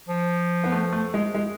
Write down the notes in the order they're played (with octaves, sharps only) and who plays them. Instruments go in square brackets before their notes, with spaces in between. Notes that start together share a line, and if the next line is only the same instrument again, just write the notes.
[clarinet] F3
[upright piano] B3
A3
A3
G#3
G#3